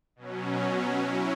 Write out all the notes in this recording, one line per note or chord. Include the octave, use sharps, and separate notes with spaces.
B2 F#3 C#4
F#3 C#4 E4